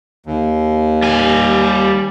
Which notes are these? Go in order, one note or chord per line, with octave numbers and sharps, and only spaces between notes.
D#2
G3 G#5